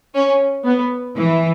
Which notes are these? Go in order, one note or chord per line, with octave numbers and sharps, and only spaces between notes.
C#4
B3
E3